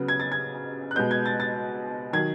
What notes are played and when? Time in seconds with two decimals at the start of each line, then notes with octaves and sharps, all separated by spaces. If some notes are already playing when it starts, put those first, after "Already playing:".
Already playing: C#3 F#3 B3
0.08 G#6
0.20 A6
0.32 G#6
0.91 F#6
0.96 B2 G#3 B3 G6
1.11 G#6
1.26 A6
1.40 A6
2.13 D#3 F#3 G#6